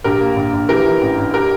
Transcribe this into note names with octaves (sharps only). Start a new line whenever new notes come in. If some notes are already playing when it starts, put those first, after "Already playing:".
A#1 G4 A#4
A#3
A#1
A#1
E3 G4 A#4
E3
A1
A1
G4 A#4